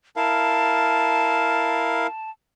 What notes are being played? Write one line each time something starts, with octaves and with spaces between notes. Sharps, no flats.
E4 A#4 F5 A5